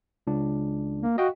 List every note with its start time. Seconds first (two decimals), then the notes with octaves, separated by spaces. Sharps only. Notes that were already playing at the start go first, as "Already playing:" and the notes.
0.27 C#2 D4
1.02 A#3
1.18 F#4 D#5 F5 G5